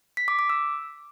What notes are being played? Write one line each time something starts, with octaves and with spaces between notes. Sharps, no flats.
B6
D6
D6
E6